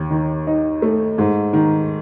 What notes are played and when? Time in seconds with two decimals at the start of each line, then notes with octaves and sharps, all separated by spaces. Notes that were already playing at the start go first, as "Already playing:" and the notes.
Already playing: D#2
0.11 D#3
0.47 D#4
0.82 A3
1.18 G#2
1.53 D#3